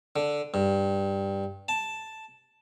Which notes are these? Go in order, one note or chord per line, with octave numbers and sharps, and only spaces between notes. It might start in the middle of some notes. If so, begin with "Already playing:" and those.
D3
G2
A5